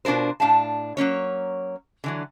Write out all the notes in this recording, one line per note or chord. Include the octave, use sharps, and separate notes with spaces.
B2 D4 F4 A#4 C5
A2 D4 F5 A5
F#3 A#3 C#4 C#5
D3 E3 F#3